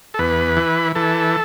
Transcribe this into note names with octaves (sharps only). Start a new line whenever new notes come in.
A4
E2 B4
E3
E3 A4